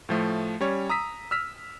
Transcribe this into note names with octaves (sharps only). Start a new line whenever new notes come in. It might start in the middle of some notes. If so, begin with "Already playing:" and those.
A2 F3 A3
G3 C#4 C#5
A#5 D#6 E6 B6
E6 F6 B6